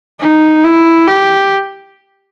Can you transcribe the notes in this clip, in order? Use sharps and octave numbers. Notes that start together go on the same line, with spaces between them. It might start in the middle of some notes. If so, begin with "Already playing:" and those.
D#4
E4
G4